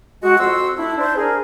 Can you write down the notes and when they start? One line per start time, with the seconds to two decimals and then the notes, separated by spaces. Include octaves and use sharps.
0.23 G#3 F#4
0.39 F2 F#4 C6 E6
0.78 A3 D4 E4
0.98 D4 C5
1.17 G#4 A#4